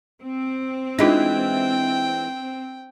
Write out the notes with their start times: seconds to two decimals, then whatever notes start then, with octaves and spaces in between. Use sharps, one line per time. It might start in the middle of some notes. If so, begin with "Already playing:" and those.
0.22 C4
0.99 E3 G#3 D4 D#4 F4 G5